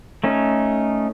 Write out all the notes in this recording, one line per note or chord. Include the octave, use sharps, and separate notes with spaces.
A3 C#4 D#4